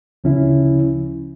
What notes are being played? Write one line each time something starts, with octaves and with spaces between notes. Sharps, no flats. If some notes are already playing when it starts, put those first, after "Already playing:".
D2 C#3 F3 C#4 E4